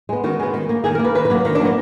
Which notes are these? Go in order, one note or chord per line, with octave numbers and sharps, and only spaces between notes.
G#3 B3
D#3 F#4
G#3 B3
D#3
A#3
D#3 G#4
A#4
A#3
B4
D#3 B4
B4
F#3 A#3
D#3
D4
F#3 A#3 B3